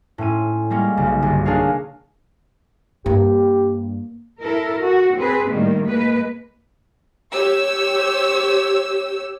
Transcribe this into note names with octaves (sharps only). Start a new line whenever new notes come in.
A2 C4 C#4 D#7
G3 G#3 A#3 C#4
B1 C#3
G1
A#3 D4 G#4 A#4 C#5 F5
G2 A#3 G4
E4 A4 A#4
F#4
C4 G#4 B4
A2 D#3 G3 A#3
G#3 A#3 B4
G4 C#5 E6